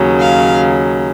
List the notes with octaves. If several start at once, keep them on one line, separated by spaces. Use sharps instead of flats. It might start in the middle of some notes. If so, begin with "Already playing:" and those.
Already playing: D#2 C#3 F#3
F5